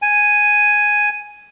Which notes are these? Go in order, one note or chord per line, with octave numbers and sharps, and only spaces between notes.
G#5